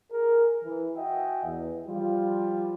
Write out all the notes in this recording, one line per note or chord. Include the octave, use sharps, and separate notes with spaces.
G#4 A#4
E3
F#4 D#5 E5 G5 G#5
E2 E3
F3 G3 F4